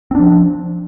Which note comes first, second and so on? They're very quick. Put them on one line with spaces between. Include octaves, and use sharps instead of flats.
C4 D4 F3